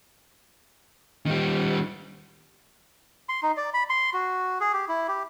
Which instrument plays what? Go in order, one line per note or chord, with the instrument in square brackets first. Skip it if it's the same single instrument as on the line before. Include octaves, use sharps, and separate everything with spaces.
[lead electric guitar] D#3 G3
[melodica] C6
D#4
D5
B5
C6
F#4
G#4
G4
E4
G4